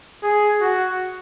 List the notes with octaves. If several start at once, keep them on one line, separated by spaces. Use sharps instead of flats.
G#4
F#4